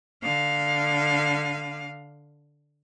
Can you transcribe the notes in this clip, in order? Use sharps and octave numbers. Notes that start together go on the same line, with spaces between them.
D3 F5